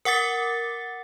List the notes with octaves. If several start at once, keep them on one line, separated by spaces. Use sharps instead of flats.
A#4 F#5 D6 A6